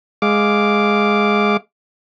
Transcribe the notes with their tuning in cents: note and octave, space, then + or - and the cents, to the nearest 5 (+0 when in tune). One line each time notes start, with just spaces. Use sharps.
G#3 +0 F5 +0 D6 -5